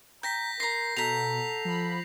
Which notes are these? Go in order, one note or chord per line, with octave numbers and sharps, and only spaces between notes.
G5 A#5 G6 A#6 B6
A#4 A#5 C6 A#6 C7
B2 A4 F#5 A#5 B6 F7
F3 B5